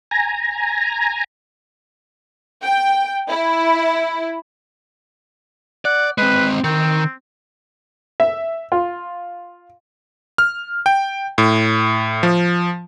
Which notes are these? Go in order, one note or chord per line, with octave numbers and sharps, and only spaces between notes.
G#5 A#5
G5
E4
D5 F#5
G#3 C4 B4
D#3 C4
E5
F4
F6
G5
A2
F3